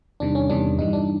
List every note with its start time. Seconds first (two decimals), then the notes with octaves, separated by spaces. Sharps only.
0.20 E2 C3 D#3 G3 D4
0.35 C#4
0.49 E2 C3 D#3 G3 D4
0.78 G2 E3 G3 D#4
0.93 D4